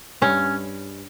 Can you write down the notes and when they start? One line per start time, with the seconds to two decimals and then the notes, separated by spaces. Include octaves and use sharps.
0.22 G2 C#4